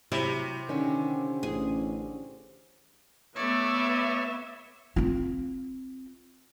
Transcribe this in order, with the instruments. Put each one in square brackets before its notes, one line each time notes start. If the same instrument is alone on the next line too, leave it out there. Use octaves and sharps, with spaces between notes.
[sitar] C3 [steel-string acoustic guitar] F#3 [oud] E4
[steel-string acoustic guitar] D3 C#4 G4 [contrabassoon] D#3
[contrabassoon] A1 [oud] G#4
[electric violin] A3 D5 [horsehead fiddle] B3 E5 [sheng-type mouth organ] C#5
[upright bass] C4 F4